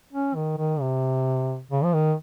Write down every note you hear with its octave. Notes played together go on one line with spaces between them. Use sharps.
C#4
D#3
D#3
C3
C#3
F3
D#3